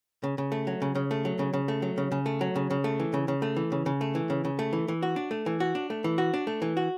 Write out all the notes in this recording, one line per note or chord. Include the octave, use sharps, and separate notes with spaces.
C#3
C#3
A3
F#3
C#3
C#3
A3
F#3
C#3
C#3
A3
F#3
C#3
C#3
A3
F#3
C#3
C#3
A3
E3
C#3
C#3
A3
E3
C#3
C#3
A3
E3
C#3
C#3
A3
E3
E3
F#4
D4
A3
E3
F#4
D4
A3
E3
F#4
D4
A3
E3
F#4